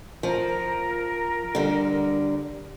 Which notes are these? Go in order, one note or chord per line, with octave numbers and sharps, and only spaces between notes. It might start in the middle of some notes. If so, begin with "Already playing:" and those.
F3 A#4
D3 G3